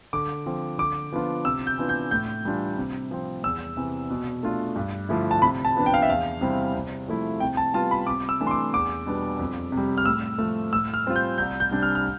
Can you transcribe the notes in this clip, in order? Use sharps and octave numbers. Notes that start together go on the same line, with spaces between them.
D3 D6
F3 C4
D3 D6
F3 B3 D4 F4
C3 E6
G6
E3 B3 D4 F4
G6
A2 G6
E3 G3 D4 F4
C3
F3 C4
E2 E6
C3 E3
B2
A3 D4 F4
G2
D3 F3 A3 E4
A5
C3 B5
A5
F3 B3 D4
G5
F5
E5
E2 F5
C3 G3 C4 E4
C3
F3 A3 E4
C3 G5
A5
G3 B3 F4 A5
B5
C3 D6
E6
E3 A3 D4
C6
D6
E2 D6
B2 G3 B3 D4
F2
C3
G3
F6
A2 E6
F3 A3
A2 E6
F6
G3 C4 F4
G6
C2 G6
G6
C3 G3 D4
F6
F6